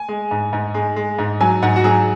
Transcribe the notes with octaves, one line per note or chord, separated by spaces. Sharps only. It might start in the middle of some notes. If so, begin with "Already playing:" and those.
Already playing: G#5
G#3
G#2
G#2
G#3
G#3
G#2
F#3 G#5
G#2 F#5
F#4
F#3 G#4